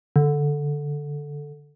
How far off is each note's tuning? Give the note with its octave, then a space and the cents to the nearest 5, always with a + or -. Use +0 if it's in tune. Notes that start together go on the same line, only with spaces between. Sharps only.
D3 -5